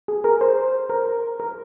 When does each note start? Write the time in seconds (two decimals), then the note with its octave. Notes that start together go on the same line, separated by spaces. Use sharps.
0.08 G#4
0.24 A#4
0.41 C5
0.90 A#4
1.40 A#4